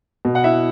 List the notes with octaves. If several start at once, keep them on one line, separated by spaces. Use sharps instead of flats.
B2
F#5
E4 E5